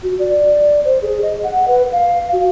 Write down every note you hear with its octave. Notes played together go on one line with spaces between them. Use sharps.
F#4
D5
C5
G#4
D#5
F#5
B4
F5
F#4